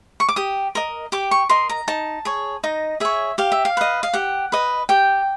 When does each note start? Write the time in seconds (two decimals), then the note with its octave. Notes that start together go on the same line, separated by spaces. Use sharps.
0.20 C#6
0.29 D6
0.36 G4 D#6
0.75 A#4 D#5
1.12 G4 D6
1.31 C#6
1.49 A#4 D#5 C6
1.69 A#5
1.88 D#4 A5
2.25 G#4 C#5
2.64 D#4 D#5
3.00 G#4 C#5 E5
3.38 G4 F5
3.52 E5
3.65 F5
3.77 B4 D#5
4.03 F5
4.13 G4 F#5
4.52 B4 D#5
4.89 G4 G5